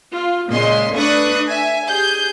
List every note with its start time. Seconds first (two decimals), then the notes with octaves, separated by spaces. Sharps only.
0.14 F4
0.49 A#2 C#3 G#3 D#5 C6
0.95 A3 D4 B4 C#6 D#6 F#6
1.47 E5 G#5
1.87 G4 G#4 G6